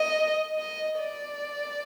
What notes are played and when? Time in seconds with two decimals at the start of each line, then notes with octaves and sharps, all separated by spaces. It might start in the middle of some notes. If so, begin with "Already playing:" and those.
Already playing: D#5
0.58 D#5
1.00 D5